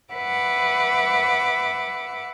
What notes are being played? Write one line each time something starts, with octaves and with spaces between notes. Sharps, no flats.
B4 E5 F#5 D6